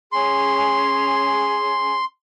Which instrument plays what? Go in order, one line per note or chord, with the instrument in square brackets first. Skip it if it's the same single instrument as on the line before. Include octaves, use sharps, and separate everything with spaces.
[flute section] C#4 G#4 [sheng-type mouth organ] C6